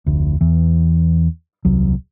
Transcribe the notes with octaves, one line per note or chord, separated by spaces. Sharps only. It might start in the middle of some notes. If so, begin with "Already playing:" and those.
F1 D2
E2 E3
D#1 C2 F#3